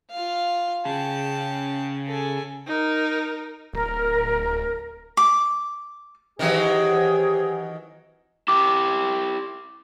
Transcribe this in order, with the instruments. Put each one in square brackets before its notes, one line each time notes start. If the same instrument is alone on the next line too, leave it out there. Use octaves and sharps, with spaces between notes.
[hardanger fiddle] F4 F5
[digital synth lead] C#3 [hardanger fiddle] G5 A5
[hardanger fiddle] A4 G#5
[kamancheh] D#4 A#4
[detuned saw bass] D1 [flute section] A#4
[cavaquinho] D6
[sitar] D#3 E3 F#3 [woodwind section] C4 G4 G#4
[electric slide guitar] E4 G4 [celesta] D6